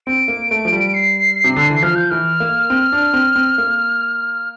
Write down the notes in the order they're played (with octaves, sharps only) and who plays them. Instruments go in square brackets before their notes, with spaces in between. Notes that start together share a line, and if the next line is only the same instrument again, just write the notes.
[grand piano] C4 [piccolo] D7
[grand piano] A#3
A3
F3
G3
[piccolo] C7
[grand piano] C3
D3
E3
[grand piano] F3 [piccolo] F6
[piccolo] G6
[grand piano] E3 [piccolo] F6
[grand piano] A#3
C4
D4
C4
C4
A#3